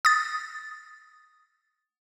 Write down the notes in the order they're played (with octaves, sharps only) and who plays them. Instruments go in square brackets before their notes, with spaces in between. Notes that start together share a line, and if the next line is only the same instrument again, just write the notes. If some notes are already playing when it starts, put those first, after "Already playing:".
[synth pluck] D#6 A6